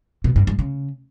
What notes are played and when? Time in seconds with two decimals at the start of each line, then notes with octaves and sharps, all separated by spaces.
0.24 B2
0.36 G2
0.47 G2
0.59 C#3